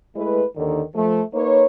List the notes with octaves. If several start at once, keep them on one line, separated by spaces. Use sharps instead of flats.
G#3 A3 E4 B4
D#2 D3 D#3
F3 A3
A#3 D#4 B4 C#5